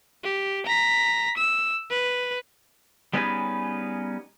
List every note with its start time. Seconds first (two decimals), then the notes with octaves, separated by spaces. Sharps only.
0.24 G4
0.66 A#5 B6
1.37 E6
1.91 B4
3.13 G3 B3 C#4 D#4 G#4 B4